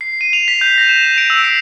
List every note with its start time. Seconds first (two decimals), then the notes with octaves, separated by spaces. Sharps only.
0.01 C7
0.21 D#7
0.33 F7
0.48 B6
0.61 G6
0.78 A#6
0.89 E7
1.05 F7
1.18 D7
1.30 E6
1.44 C7